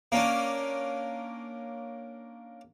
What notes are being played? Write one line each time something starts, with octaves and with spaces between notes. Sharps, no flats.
A#3 C#4 D4